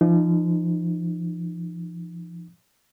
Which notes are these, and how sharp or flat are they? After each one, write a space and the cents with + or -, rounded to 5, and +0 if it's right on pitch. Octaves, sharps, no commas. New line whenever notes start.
F3 -35 D#4 -30